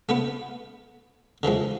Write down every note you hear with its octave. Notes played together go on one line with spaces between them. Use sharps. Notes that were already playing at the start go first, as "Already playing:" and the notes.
A3 B3 B4 F#5
D3 E3 F3 G#3